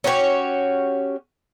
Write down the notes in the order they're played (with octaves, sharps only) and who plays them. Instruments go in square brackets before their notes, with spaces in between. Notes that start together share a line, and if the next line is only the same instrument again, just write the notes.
[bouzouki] C#4 F#4 G4 C#5